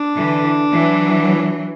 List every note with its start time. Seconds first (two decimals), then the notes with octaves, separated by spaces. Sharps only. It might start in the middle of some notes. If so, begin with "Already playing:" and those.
Already playing: D4
0.16 D3 E3
0.72 E3 F#3